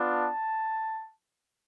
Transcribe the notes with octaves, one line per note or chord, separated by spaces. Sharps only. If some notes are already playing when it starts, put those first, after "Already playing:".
Already playing: B3 D4 F4
A5